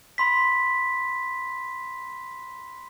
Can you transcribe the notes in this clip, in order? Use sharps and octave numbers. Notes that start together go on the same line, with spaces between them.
B5 C6 B6